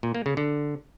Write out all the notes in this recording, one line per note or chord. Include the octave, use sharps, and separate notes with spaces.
A#2
A#3
C#3
D3